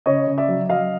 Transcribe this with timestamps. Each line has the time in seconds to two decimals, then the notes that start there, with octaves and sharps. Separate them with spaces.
0.06 C#3 C#5 D#5
0.27 C#3
0.38 D5 E5
0.48 F#3
0.69 F#3 D#5 F5